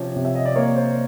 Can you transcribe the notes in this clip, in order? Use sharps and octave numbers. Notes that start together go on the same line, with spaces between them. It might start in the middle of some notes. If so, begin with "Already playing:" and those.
Already playing: C3 F3 C#4
C3
E5
D#5
D5
A#3 C#5
C5